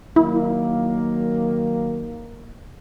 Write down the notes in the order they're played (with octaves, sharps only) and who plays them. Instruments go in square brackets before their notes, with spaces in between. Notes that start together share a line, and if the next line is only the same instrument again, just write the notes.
[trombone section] D#3 F#3 A#3 [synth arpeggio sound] E4